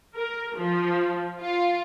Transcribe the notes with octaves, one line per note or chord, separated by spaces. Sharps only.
A#4
F3
F4